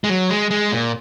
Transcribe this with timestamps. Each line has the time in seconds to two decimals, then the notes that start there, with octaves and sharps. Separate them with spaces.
0.04 G#3
0.09 F#3
0.30 G#3
0.51 G#3
0.72 A#2